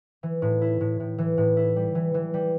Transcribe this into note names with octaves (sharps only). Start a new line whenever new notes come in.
E3
A2
E4
A2
A2
E3
A2
E4
G3
E3
E3
G3